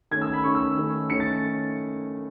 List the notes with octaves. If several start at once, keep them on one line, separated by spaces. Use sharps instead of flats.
D#3 A3 C#4 G#6
E6
B5
D#3 A3 C#4 C#6
E6
D#3 A3 C#4
D#3 A3 C#4 C#7
A6